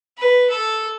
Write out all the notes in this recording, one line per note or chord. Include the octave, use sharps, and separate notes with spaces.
B4
A4